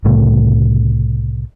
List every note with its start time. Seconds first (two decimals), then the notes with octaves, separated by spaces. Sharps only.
0.04 C2 A2 C#3 A3